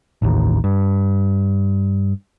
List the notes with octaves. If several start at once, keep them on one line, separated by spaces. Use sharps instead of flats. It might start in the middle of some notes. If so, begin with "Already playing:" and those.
A1 D#2
G2